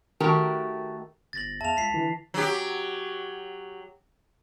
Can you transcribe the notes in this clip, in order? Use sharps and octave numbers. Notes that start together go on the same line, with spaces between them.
D#3 A3 F#4 G4 A#4 A#5
G1 A6 A#6 F#7
E2 E5 F5 A5 F7
C#2 B6 C7
D3 E3 E4
F#3 G4